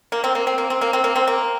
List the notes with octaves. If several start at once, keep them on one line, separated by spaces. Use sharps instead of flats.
A#3
C4
A#3
C4
A#3
C4
A#3
C4
A#3
C4
A#3